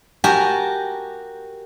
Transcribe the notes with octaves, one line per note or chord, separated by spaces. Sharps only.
F#4 G4 A#4 G#5 A5